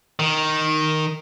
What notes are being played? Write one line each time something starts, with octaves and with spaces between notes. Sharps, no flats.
D#3